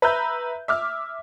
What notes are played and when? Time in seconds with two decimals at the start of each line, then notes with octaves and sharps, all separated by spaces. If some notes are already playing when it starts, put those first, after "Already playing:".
0.02 B4 E5 A#5 G6
0.68 E5 D6 F6